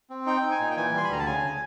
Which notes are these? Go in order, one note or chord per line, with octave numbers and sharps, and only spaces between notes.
C4
D#4 G5
D#4
G#5
A#2
G5
E3 G#5
G3 C6
B5
D2 A#5
A5
C#3 G#5
C#3